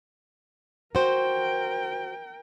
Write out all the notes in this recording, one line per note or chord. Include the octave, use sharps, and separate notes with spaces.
F#4 A#4 C5 G5